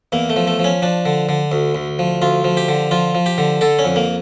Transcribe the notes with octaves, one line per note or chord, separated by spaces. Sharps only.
E2 A#3
A3
F3
A3
F3
C#4
F3 D4
D3
D3
D2
D2
F3
D2 F4
F3
G4
D3
F3 F4
F3
G4
D3
D3 A4
C#4
F2
A#3